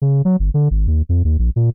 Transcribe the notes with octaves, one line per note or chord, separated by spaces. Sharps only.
C#3
F#3
G1
D3
G#1
D#2
F2
D#2
A#1
A#2